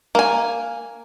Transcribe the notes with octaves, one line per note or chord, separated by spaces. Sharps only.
A#3 G#5